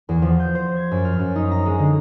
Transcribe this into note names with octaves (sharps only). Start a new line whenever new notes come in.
E2
F3
G6
C5
G#6
F#2
F6
F#2
D#4
A#5
G#3
D3